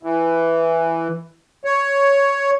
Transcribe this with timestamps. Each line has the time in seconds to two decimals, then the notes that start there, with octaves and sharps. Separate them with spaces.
0.03 E3
1.65 C#5